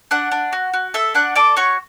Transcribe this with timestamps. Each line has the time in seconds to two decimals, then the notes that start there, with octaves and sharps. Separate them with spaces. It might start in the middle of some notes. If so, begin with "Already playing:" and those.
0.11 D4 F#5 F#6
0.32 D4
0.53 F#4
0.74 F#4
0.94 A4 E5 E6
1.14 D4 F#5 F#6
1.35 A4 D5 D6
1.56 F#4 C#5 C#6